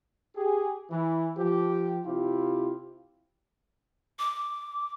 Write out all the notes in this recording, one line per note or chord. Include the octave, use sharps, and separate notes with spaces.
G4 G#4
E3
F3 G4
C3 E4 F4 G4
D6